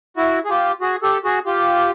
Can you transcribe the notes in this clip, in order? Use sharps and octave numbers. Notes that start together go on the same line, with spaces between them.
E4 F#4
G#4
F4 G4
F#4 G#4
G4 A4
F#4 G#4
F4 G4